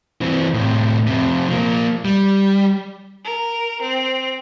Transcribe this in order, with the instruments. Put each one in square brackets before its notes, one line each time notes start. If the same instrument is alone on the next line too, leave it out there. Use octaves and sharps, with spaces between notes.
[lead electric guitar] E3 C4
A2 C3
F2 C3
F3 A#3
G3
[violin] A#4
C4